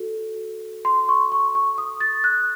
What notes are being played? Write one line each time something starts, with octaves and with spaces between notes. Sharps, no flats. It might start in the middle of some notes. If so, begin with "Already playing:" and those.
Already playing: F#4 A4
C6
C#6
C#6
C#6
D#6
A6
F#6